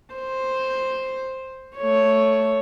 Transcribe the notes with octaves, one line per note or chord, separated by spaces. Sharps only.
C5
A3 C#5